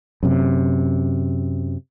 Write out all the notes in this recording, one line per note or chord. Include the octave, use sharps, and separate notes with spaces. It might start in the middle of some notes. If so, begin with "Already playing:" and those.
F#2 C3